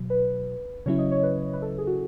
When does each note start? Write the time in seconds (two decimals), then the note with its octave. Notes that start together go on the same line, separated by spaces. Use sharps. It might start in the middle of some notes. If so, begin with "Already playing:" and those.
Already playing: B2 F#3
0.10 B4
0.86 C#3 F#3 C#4 E4 C#5
0.98 D#5
1.11 C#5
1.23 B4
1.53 B4
1.62 A4
1.78 G#4
1.87 F#4